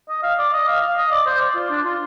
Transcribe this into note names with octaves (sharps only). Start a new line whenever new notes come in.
D#5
F5
D5
D#5
F5
F5
D#5
D5
C5
D5
F4
D4
F4